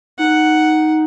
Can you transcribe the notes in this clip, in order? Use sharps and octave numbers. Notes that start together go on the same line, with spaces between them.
D#4 F#5